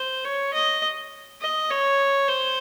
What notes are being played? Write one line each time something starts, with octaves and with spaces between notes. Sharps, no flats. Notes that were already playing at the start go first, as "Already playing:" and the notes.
Already playing: C5
C#5
D#5
D#5
C#5
C5